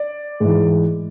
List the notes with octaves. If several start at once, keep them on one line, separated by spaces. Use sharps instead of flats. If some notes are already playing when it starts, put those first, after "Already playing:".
Already playing: D5
G#2 E3